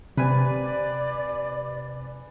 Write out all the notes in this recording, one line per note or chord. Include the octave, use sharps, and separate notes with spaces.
C3 B4 D5 G#5